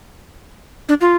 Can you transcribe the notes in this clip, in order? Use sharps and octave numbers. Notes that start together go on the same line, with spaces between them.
D4
F4